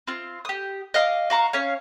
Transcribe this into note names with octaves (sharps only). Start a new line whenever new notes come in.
C4 F4
G4 D#6
D#5 F5 D6
F#4 F5 A#5 C#6
C#4 C#5 F5